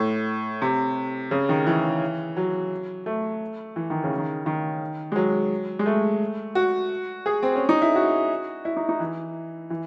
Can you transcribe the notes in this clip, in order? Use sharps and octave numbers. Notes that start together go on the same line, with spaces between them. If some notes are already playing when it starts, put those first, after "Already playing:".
Already playing: A2
C3
C#3
D#3
E3
F#3
A3
E3
D#3
C#3
D#3
D#3
G#3
F#3
G#3
A3
F#4
G#4
C4
C#4
D#4
E4
F#4
E4
D#4
D#4
E3
E3